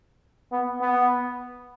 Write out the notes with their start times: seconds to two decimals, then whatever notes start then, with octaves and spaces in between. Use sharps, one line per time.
0.52 B3
0.81 B3